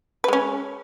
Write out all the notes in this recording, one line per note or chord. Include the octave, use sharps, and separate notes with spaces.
G#3 C#4 B4